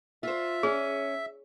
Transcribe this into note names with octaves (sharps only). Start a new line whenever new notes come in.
F4 C5 E5
C#4 G#4